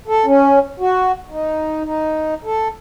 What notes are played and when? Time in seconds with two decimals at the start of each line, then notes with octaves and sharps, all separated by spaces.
0.08 A4
0.26 C#4
0.80 F#4
1.30 D#4
1.84 D#4
2.44 A4